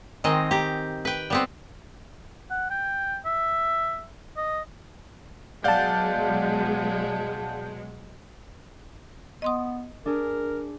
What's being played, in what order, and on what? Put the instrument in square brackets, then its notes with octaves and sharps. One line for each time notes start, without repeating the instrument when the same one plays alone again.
[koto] D#3 G#3 C4 D#5
G4 A#5
B4 G5
G3 B3 C4
[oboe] F#5
G5
E5
D#5
[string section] B2 F#3 G#3 [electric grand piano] D5 F5 F#5 [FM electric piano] A5 G6
[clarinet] B3 [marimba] D#5 C6 D#6
[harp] D4 G#4 [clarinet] A#4